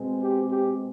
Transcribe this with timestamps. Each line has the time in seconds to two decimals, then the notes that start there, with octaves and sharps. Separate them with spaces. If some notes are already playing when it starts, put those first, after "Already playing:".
Already playing: B2 G#3 C4
0.20 G4
0.51 G4